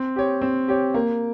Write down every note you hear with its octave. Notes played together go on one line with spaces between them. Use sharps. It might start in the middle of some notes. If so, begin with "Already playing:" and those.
Already playing: C4
G4 C#5
C4
G4 C#5
A#3